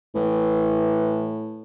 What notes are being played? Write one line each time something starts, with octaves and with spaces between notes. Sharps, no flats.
A2 E3